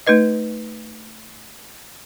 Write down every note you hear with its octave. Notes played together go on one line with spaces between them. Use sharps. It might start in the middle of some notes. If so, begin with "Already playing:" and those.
A3 D#4 B4 D#5